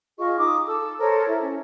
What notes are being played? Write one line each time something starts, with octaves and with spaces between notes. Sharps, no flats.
F4 G#4 D#5 C#6
D#4 D6 D#6
A4 E6
A4 A#4 C5 C#5
E4
C#4